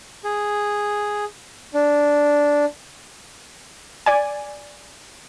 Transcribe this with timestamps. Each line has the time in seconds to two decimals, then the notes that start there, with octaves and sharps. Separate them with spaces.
0.24 G#4
1.74 D4
4.06 D5 G#5